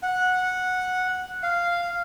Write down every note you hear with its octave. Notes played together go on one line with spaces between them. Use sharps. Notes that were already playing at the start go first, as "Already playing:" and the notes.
F#5
F5